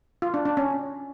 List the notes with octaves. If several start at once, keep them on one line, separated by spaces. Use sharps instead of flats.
F4
D4
D4
C#4